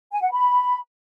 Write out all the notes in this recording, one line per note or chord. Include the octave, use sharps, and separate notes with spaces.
G#5
F#5
B5